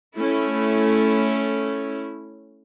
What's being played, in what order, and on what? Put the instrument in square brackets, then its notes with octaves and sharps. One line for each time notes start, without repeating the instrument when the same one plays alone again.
[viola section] A3 C#4 E4